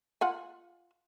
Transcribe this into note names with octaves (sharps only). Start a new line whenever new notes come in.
F4 F#5 G#5